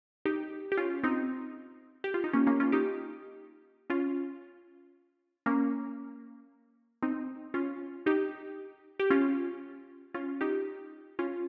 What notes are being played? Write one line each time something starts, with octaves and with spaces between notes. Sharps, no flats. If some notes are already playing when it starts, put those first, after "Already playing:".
D#4 G4
G4
C#4 F4
C4 D#4
G4
F4
D#4
A#3 C#4
A#3 C#4
C#4 F4
D#4 G4
C#4 F4
A#3 C#4
C4 D#4
C#4 F4
D#4 G4
G4
C#4 F4
C#4 F4
D#4 G4
C#4 F4